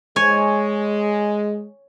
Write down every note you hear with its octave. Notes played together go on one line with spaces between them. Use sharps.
G#3 C#5 G#5